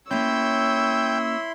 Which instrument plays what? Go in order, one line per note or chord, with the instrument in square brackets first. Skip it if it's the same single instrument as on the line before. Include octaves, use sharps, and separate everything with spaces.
[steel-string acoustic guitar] A#3 C#4 [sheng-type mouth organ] E4 B5 C6 [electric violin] C#5 E6 [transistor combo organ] G5